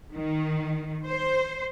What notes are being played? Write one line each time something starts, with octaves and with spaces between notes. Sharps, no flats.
D#3
C5